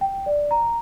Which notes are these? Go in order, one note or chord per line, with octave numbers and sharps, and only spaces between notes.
G5
D5
A#5